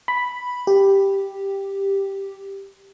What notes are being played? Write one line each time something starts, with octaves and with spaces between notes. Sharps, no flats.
B5
G4